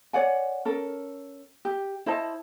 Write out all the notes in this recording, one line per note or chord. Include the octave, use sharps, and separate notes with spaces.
C#5 D5 F#5 G#5
C#4 A4 A#4
G4
E4 C5 D#5 A5